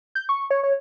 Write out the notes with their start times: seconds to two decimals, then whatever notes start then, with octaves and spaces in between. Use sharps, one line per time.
0.15 G6
0.29 C#6
0.51 C#5
0.63 C#5